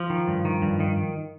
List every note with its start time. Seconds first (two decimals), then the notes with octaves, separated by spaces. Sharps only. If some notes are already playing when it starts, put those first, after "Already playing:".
Already playing: F3
0.10 D#3
0.28 G2
0.45 D#3
0.62 G2
0.80 D#3